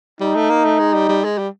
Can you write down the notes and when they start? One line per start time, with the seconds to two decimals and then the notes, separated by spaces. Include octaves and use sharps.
0.21 G3 D#4
0.35 A3
0.50 A#3
0.65 A3
0.79 G#3
0.94 G3
1.09 G3
1.24 G#3
1.38 G3